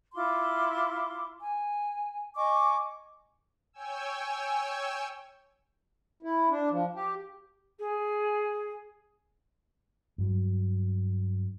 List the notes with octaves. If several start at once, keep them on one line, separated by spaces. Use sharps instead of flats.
E4 F4 C6 D6
G#5
D#5 G#5 C#6 D6
C#5 G5 G#5 E6
E4
D4
F3
G4
G#4
G2 F#3